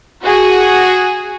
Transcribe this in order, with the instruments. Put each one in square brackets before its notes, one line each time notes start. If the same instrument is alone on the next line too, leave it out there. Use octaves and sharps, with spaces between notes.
[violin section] F#4 G#4